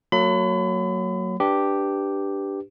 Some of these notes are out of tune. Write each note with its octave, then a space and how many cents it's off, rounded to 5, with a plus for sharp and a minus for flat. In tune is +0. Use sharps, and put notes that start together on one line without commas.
F#3 +0 A#3 -35 B5 +35
D4 +0 G4 +0 B4 +0